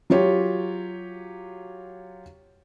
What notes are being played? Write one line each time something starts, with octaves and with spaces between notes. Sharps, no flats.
F#3 F4 G4 C#5